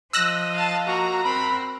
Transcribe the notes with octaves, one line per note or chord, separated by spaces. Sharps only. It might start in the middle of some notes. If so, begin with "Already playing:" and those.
F3 D#5 E6 F#6 A#6
F5 A5
A#3 F#4 A#5
C4 A#4 B5